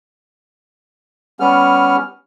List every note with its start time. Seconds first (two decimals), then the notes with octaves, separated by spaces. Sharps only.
1.40 G3 B3 C#4 F6